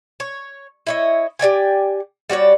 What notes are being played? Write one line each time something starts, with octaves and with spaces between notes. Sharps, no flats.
C#5
E4 C#5 D#5
G4 D5 G5 G#5
G3 F#4 C#5 D5